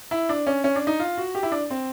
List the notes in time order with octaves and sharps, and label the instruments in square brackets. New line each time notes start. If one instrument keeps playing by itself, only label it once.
[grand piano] E4
D4
C#4
C#4
D4
D#4
F4
F#4
G4
E4
D4
C4